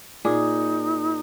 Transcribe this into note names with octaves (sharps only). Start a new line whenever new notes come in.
A#2 D#4 G#4